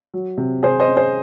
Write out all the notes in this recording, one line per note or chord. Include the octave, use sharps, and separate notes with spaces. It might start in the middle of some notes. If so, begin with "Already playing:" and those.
F#3
C3
C3 G#4 C5
C5 D#5
C#4
G#4 C5